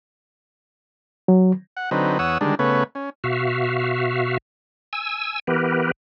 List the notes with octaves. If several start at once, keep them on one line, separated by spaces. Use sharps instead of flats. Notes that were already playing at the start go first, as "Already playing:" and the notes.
F#3
F#5
D3 F#3 C4 D#4 B4
E2 C#5 F#5 D#6 E6
D3 D#3 G3 G#3 D4
C#3 A3 B3 B4 C#5
C#4
B2 F#4 E5 F5
G#5 E6
E3 B3 G4 A#4 B4